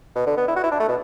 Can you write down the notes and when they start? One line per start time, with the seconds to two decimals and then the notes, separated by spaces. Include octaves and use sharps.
0.16 B2
0.26 D3
0.37 B3
0.48 E4
0.56 F#4
0.63 E4
0.71 D4
0.80 A3
0.88 B2